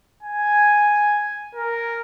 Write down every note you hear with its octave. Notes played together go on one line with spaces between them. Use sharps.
G#5
A#4